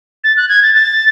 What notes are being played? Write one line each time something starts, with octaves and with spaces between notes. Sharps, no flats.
A6
F#6
G#6
A6
A6